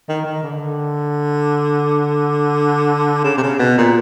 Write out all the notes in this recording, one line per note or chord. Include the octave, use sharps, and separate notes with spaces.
D#3
D#3
D3
C#3
C3
C#3
B2
A#2